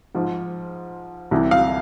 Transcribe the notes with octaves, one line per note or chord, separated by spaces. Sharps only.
G#2 F3
C2 C3 E3
F5